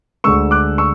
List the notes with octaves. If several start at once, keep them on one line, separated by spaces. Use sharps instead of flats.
D2 D3 G#3 C#6 E6
D6 F#6
C#6 E6